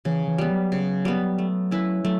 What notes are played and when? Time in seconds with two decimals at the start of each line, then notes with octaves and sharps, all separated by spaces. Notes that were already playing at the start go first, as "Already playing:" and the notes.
0.05 C#3 E3
0.28 E3
0.38 G3 B3
0.50 F#3
0.72 C#3
1.05 G3 B3
1.38 A3
1.71 C#4 E4 B4
2.05 F#3 A3